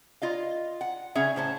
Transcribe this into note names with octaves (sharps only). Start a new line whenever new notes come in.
F4 D#5 F5
F#5
C#3 C#4 G#4 E5
A2 C5 A5